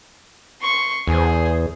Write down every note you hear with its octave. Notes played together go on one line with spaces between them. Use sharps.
C6 C#6
E2 G#4 C5